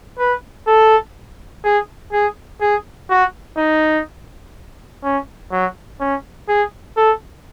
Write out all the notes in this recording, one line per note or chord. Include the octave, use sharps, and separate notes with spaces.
B4
A4
G#4
G#4
G#4
F#4
D#4
C#4
F#3
C#4
G#4
A4